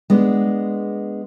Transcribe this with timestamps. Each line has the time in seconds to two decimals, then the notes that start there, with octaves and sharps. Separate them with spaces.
0.10 G#3 B3 D4